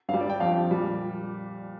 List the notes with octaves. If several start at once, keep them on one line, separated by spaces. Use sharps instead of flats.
G2 F5
G3
D5
G5
F2 F3 F5
A#2 G3